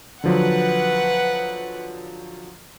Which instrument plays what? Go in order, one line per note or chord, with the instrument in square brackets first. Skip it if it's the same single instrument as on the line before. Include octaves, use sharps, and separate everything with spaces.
[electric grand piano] D3 F3 F#3 [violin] B4 F#5